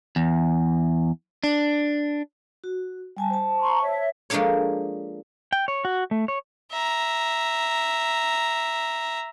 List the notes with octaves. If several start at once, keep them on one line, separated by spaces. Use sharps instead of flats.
E2
D4
F#4
G3 G#5 A5
C5 A5
A#5 C6 C#6
C#5 E5
F3 G#3 A#3 D4 A4 C#5
G5
C#5
F#4
A3
C#5
E5 A#5